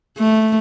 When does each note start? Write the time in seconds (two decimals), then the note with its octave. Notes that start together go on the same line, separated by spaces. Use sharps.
0.18 A3